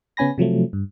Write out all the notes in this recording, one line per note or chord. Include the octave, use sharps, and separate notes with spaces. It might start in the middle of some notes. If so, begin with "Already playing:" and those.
C#3 B3 C#4 G#5 B5 A#6
C3 F3 F#3 A3
G2